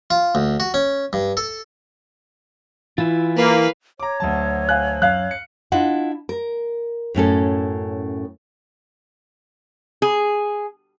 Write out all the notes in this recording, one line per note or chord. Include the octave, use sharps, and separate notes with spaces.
F4
D2
F#4
C#4
G2
A4
E3 E4 F4
A#3 B4 F5
C#5 A#5 D6
D2 F#3 A5
F5 G#5 F#6
F#2 F5 F#6
C#7
D4 E4 F4 D#5 F#5
A#4
F#2 A2 C#4 A4
G#4